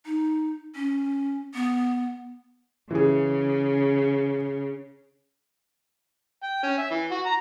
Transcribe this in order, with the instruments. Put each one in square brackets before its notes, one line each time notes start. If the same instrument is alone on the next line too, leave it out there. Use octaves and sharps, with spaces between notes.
[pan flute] D#4
C#4
B3
[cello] C#3 [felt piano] E3 G#4
[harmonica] G5
C#4
E5
E3
F#4
A#5